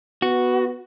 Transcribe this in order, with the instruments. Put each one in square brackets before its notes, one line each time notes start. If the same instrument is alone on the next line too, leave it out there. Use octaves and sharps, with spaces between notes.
[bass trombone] B3 [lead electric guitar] F#4